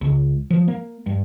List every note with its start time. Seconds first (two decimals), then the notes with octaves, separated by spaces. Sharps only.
0.01 C#2
0.50 F3
0.68 A#3
1.06 G2